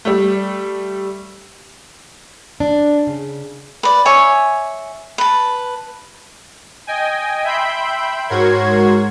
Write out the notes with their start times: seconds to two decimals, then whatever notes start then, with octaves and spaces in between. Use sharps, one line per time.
0.05 G3 A3
2.60 D4
3.07 C#3
3.83 B4 D5
4.05 C#5 E5 G#5
5.18 B4 A5
6.87 D#5 G5 G#5
7.44 E5 G5 B5 C6 G6
8.29 G#2 F#4 A#4 C#5 C6 G#6